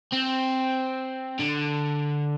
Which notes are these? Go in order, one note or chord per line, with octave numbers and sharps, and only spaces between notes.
C4
D3